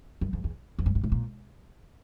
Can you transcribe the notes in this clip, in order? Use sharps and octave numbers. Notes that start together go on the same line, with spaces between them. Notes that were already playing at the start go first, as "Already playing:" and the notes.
F#2
F2
E2
F2
G2
G#2
A2
A#2